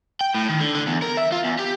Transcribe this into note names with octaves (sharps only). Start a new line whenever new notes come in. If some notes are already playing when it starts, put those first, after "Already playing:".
G5
A2
D#3
D3
D3
E2
A#4
E5
F4
E2
G4